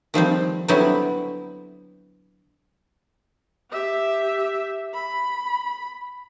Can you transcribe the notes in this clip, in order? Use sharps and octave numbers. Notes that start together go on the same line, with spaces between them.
D#3 F3 G3 C4
D3 F#3 G3 B3 C4 E4
G4 E5
B5